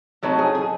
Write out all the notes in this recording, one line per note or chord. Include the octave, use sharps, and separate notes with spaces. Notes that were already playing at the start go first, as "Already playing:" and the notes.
A2 F#3 A3 C4 D#4
G#4
G#4